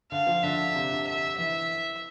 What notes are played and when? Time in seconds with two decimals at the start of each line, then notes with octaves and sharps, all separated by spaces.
0.11 D3 F5
0.27 F3
0.43 D3 E5
0.75 C3
0.91 D3
1.07 E5
1.38 E3 E5